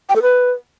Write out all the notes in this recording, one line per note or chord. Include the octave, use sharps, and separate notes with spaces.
G5
A4
B4